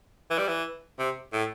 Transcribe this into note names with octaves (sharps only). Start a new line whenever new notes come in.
E3
G3
E3
C3
A2